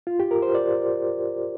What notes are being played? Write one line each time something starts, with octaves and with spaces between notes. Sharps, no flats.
F4
G4
A#4
C5
D5